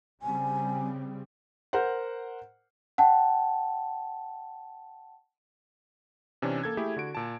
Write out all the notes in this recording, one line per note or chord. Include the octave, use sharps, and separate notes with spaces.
C#3 G3 C4 G#5
A#4 C5 F#5
F#5 G5 A5
C3 E3 C#4 D4
A#3 A4 G#6
A3 E4 G4 G#4
D3 F#4 D7
A#2 A5